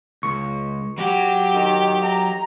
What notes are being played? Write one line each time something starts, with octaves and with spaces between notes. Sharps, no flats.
C#2 C#6
F#3 G4 F#5
D#3
A#5